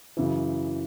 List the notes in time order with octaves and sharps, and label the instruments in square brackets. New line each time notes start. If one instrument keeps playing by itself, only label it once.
[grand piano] F#2 C#3 E3